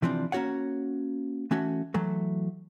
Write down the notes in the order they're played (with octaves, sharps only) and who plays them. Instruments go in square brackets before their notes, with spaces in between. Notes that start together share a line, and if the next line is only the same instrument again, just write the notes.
[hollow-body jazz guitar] C3 E3 F3 C4 D4
A#3 C#4 F#4 C#5 F#5
E3 A3 C#4 F#4
E3 F#3 A3